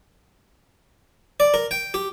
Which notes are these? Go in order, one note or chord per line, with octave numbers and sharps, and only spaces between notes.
D5
A#4
G5
G4